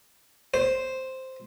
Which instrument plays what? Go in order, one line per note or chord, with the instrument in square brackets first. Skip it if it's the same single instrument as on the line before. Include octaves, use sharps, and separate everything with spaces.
[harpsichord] C5